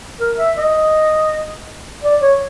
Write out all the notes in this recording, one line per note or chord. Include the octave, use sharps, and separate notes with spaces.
A#4
E5
D#5
D5
C#5